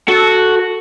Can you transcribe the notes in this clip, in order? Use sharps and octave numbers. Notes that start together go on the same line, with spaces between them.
F#4 A4